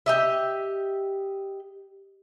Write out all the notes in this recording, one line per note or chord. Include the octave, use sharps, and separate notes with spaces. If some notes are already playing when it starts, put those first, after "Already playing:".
G4 D#5 E5